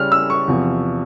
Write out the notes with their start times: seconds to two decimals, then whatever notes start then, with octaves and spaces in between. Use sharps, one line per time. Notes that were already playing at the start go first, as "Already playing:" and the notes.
Already playing: C#3 G3 C#4 F6
0.12 E6
0.30 C#6
0.48 E2 C3 F3